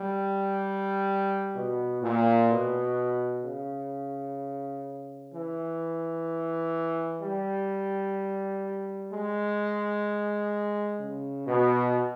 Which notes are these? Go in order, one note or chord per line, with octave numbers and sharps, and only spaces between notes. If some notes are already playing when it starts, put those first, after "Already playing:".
Already playing: G3
B2
A#2
B2
C#3
E3
G3
G#3
C#3
B2